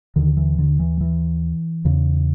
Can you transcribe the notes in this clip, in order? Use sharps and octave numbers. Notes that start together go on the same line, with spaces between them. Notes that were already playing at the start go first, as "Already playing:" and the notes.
D#2 D3 D#3
E3
D3
E3
E3
E2 C#3